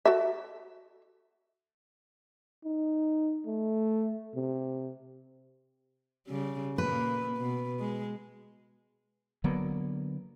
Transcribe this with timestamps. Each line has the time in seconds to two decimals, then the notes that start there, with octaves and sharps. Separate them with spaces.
0.05 F#4 A4 E5
2.65 D#4
3.46 A3
4.35 C3
6.27 C#3 G3
6.78 A#2 A#3 B4
7.36 B2
7.79 G#3
9.44 D3 F#3 A#3 B3